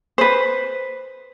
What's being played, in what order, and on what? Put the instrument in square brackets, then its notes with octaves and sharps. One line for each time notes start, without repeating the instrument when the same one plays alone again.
[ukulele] B4 C5